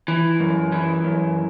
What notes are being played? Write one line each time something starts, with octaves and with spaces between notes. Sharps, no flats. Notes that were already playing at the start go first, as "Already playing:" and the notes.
E3
F#2
E3
F#2